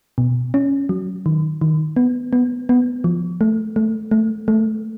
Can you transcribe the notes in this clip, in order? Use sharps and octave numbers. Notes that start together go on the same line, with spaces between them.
B2
C#4
F#3
D#3
D#3
B3
B3
B3
F3
A3
A3
A3
A3